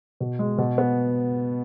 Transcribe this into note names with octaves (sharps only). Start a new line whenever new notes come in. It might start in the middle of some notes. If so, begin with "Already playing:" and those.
B2
G#3
B2
B3